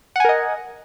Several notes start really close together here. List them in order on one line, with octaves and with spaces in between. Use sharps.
F#5 G#5 A#4 D#5